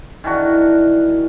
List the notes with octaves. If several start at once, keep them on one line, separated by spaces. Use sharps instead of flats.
D#3 E3 D4 F#4